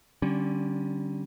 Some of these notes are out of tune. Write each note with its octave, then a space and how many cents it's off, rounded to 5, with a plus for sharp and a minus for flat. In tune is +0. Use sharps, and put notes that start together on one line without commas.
D3 +0 G3 -25 C#4 -25